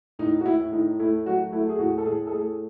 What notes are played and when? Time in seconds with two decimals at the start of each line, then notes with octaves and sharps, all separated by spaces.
0.19 A2 D#4
0.41 F#4
0.45 A2 E4
0.72 A2 D#4
0.99 A3 E4
1.26 F#3 F#4
1.52 A3 E4
1.69 G#4
1.79 A2 F#4
1.98 A4
2.05 A2 G#4
2.27 A4
2.32 A3 G#4